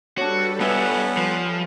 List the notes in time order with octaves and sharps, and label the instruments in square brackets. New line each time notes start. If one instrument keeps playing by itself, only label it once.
[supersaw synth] G3 A4 B4 [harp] D4 C#5 [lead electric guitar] F#4
[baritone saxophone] B3 [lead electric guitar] D4 F4 [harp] C#5 E5 G#5
[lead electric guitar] F3